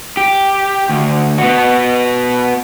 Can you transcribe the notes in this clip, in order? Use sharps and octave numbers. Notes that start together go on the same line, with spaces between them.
G4
D2
B3 F#4